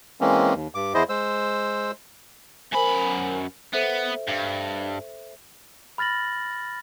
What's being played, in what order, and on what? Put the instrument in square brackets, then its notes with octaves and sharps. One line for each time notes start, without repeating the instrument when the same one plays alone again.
[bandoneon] E3 G#3 A#3 C4 C#4
D#2
G2 D6
E2 E4 G#4 C5 D#5
G#3 C5 E6
[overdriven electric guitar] F#2 B5 [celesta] A#4 C5 G#5
[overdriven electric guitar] B3 [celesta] A4 C5 E5
[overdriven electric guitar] G2
[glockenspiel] B5 F6 A6 A#6 F#7